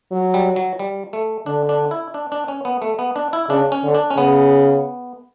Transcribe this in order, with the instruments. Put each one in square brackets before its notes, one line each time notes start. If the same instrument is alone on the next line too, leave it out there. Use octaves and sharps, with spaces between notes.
[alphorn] F#3
[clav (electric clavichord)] G3
F#3
G3
A3
[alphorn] D3 [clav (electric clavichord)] D4
[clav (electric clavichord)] D4
E4
D4
D4
C#4
B3
A3
B3
D4
E4
[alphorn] C#3 [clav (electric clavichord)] D4
[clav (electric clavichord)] C#4
[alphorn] D3
[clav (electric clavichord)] D4
C#4
[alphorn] C#3 [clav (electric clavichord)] B3